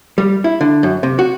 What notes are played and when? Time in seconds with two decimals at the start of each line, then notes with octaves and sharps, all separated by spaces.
0.18 G3
0.44 E4
0.61 D3
0.83 F#2
1.03 C3
1.19 F#4